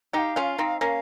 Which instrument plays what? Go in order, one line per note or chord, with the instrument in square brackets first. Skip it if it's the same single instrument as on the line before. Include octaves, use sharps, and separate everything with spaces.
[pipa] D#4 G4 [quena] F5 G5
[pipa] C#4 F4
C4 D#4
[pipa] A#3 C#4 [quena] F5